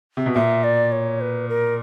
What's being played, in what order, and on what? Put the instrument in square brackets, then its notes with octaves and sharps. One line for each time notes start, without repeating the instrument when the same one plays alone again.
[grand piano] C3
B2
[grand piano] A#2 [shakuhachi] E5
[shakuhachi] D5
C#5
B4
A#4